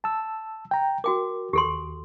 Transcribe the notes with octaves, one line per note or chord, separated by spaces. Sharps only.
A5 E6
G5 A#5
F#4 A#4 G5 D6
D#2 G4 A4 C6